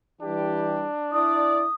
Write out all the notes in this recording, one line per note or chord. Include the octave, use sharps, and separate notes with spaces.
E3 G3 D4 G4
E4 D5 D#6